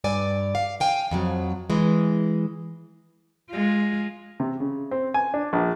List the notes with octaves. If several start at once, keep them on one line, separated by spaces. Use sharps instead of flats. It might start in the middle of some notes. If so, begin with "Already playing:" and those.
G2 D5 G#5
F5
F5 G5 G#5
F2 F3 F#3
E3 G#3
G#3 F4
C3
C#3
C4
G#5
D4
A#1